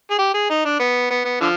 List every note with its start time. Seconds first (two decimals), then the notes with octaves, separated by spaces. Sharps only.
0.11 G#4
0.19 G4
0.34 G#4
0.50 D#4
0.65 D4
0.80 B3
1.11 B3
1.25 B3
1.41 D3 F3